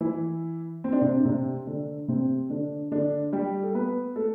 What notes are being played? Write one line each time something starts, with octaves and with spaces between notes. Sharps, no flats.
E3 E4
C4
D4
C3 C4
D4
C3 C4
D3 D4
C3 C4
D3 D4
D3 D4
G3 G4
A4
B3 B4
A3 A4